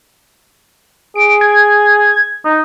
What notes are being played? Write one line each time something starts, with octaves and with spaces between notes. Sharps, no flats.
G#4 D7
G#6
D#4